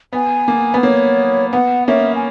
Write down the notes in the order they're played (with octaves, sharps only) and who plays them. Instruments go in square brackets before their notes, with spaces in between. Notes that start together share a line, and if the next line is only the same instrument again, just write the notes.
[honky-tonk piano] B3 [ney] G#5
[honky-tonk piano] A#3
B3
[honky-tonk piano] A#3 [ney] C#5
[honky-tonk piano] B3 [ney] F#5
[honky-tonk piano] A#3 C#4 [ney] E5
[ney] G#5